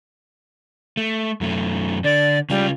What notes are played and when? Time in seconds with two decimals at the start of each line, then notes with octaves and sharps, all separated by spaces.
0.97 A3
1.41 F#2 A3
2.04 D3 D5
2.50 C#3 G3 F4